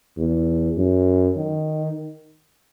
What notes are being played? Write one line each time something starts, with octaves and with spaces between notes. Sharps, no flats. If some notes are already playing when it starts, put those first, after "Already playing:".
E2
F#2
D#3